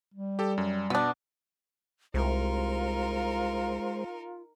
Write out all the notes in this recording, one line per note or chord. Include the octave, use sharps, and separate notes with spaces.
G3
G4 A4
F#2
B2 B3 D4
C2 G#3 D#4 F4 A#4 C5